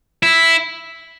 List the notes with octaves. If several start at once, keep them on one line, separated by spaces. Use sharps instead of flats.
E4